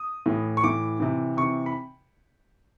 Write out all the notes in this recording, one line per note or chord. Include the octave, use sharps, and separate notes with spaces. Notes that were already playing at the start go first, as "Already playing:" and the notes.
Already playing: D#6
A2 E3
C#6
A2 E3 D6
C3 E3
C3 E3 C#6
B5